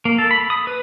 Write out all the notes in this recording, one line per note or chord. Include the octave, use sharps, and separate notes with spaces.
A#3
A4
B5
D#6
B4